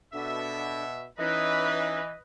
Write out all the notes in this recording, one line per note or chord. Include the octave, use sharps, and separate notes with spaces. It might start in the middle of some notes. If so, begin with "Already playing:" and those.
B2 D4 A4 E5 F#5
E3 C#4 D#4 B4 D#5 E5